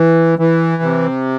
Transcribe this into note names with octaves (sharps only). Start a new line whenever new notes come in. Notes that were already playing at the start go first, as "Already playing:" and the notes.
Already playing: E3
E3
C3